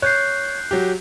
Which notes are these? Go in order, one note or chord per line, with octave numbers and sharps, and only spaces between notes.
C#5 F#6 G6 C7
F#3 G4